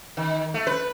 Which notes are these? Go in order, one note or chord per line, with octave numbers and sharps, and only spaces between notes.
D#3
A3
B4